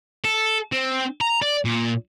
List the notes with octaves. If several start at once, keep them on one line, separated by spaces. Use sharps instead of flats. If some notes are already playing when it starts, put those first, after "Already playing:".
A4
C4
A#5
D5
A#2